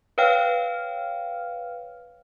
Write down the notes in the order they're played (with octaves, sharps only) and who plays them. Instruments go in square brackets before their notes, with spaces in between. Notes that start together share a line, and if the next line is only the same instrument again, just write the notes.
[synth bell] B4 C#5 F5 G5 F6